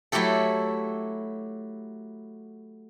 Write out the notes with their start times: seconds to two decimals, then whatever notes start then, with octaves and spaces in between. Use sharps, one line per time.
0.12 F#3 A3 E4 F#4 G4 A4